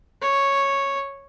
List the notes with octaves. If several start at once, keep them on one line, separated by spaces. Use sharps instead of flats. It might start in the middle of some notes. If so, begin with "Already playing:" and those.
C#5